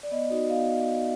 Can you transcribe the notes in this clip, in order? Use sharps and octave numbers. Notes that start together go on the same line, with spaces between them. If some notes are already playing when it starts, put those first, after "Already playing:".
D5
B3 D#5
D#4 F#4
B3 F5